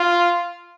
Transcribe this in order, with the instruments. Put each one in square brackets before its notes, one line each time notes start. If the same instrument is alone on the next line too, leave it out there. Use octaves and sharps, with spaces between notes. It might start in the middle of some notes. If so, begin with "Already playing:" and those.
Already playing: [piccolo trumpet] F4